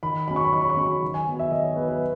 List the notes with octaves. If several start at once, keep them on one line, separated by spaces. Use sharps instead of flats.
D#3 B5
F#3 C#4 B5
C#6
B5
D#3 C#6
B5
C#6
F#3 C#4 B5
D#3
G#5
F#3 B3
E5
D#3 D#5
C#5
F#3 B3 B4
B4